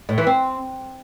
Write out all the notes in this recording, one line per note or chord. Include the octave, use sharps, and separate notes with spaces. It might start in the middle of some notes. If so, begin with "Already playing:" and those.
A2
E3
C4